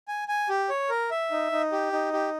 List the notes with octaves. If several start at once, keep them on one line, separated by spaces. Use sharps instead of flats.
G#5
G#5
G4
C#5
A#4
E5
D#4
D#4
G4
D#4
G4